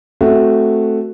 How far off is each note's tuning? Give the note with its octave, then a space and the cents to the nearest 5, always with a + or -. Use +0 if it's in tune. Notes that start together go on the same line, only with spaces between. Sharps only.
A3 +0 C4 +0 F#4 +0